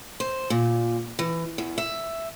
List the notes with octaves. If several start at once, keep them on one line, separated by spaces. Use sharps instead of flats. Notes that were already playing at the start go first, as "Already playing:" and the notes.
C5
A#2
E3
E2
E5